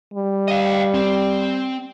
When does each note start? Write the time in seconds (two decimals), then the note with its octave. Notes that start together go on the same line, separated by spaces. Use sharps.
0.14 G3
0.48 D#5 F5
0.94 C4